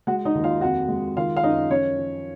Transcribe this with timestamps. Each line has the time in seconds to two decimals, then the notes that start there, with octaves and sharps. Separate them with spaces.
0.07 G#3 F#4 F#5
0.25 D#4 D#5
0.35 D#2
0.44 F4 F5
0.61 F2 F#4 F#5
0.88 G#3
1.16 D#3 F4 F5
1.36 F5
1.43 F#2 D#4 D#5
1.71 F3 C#4 C#5
1.98 F3